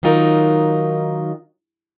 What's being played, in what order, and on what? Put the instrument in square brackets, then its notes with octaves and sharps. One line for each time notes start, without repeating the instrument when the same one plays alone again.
[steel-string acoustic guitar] D#3 F#3 D#4 F4 A#4